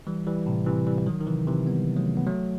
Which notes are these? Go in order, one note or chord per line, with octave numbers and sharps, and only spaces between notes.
E3 G3
E3 G3
A2 C3
C3 E3
E3 G3
E3
D#3 F#3
D#3
C3 E3
C3 E3
G3 B3
F#3 A3
B3
F#3 A3